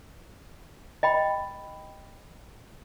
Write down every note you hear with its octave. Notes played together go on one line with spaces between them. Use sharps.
D#5 G5 B5